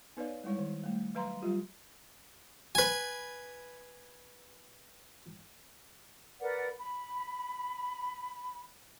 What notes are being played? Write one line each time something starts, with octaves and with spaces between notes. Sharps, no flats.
B3 D#4 B4 C#5 D5 F5
G3 G#3 E4 C#5
D#3
G3 A3
F#3 B4 F5 A#5 C6
F#3 G3 F4 G4
B4 G#5
A#4 B4 D5 F#5
B5